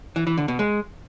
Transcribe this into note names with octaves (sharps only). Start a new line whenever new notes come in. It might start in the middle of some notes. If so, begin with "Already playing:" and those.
E3
E3
D3
B2
G#3